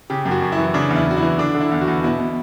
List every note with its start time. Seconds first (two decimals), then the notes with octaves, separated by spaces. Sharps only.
0.10 C#3 G4
0.25 F#2
0.31 F#4
0.42 F#2
0.52 E4
0.58 E3
0.74 C#3 D4
0.90 E2
0.96 E4
1.06 E2 F#4
1.17 E4
1.23 E3
1.38 D3 D4
1.55 D3
1.61 E4
1.71 E2
1.81 F#4
1.88 E2
2.03 B2 E4
2.20 B2